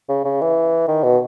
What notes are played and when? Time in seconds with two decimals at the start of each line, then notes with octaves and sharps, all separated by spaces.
0.09 C#3
0.24 C#3
0.41 E3
0.88 D#3
1.03 B2